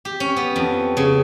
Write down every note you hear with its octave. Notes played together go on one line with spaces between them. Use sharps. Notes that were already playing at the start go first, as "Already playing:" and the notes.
G4
C#4
B3
F2
C#3